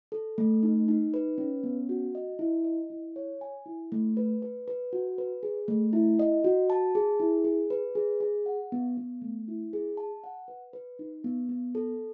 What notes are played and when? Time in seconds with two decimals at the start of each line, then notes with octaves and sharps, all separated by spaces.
0.12 A4
0.38 A3
0.63 D#4
0.88 D#4
1.14 B4
1.38 C#4
1.64 B3
1.89 F#4
2.15 D#5
2.39 E4
2.64 D#5
2.90 E4
3.16 C#5
3.41 G#5
3.66 E4
3.92 A3
4.17 B4
4.42 B4
4.68 B4
4.93 F#4
5.18 B4
5.43 G#4
5.68 A3
5.93 E4
6.19 D#5
6.44 F#4
6.70 A5
6.95 G#4
7.20 E4
7.45 G#4
7.70 B4
7.95 G#4
8.20 G#4
8.46 F#5
8.72 B3
8.98 B3
9.22 A3
9.48 E4
9.73 G#4
9.97 A5
10.24 F#5
10.48 B4
10.73 B4
10.99 D#4
11.24 B3
11.49 B3
11.75 A4